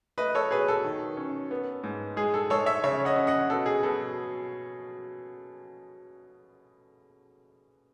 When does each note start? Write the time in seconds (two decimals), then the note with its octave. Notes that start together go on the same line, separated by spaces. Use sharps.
0.18 A3 B4 D#5
0.35 A4 C#5
0.51 B2 G#4 B4
0.68 A4
0.84 D#3
1.17 C#4
1.51 B3
1.84 G#2
2.16 G#3 G#4
2.34 A4
2.50 G#3 A4 C#5
2.66 C#5 E5
2.84 C#3 C#5 E5
3.05 D#5 F#5
3.16 C#4
3.27 D#5 F#5
3.50 B2 A4
3.66 G#4
3.83 B2 A4